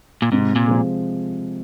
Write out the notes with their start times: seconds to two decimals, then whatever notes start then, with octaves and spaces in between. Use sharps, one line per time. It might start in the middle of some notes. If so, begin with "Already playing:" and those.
0.22 A#2
0.32 G#2 C3
0.56 A#2
0.68 F3 G#3